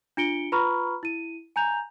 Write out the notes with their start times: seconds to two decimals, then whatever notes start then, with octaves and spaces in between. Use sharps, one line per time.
0.17 D4 F4 C#7 D7 G7
0.52 F4 B4 A#5 B5 C#6 F6
1.03 E4 D#7
1.56 G#5 A#5 G6 F7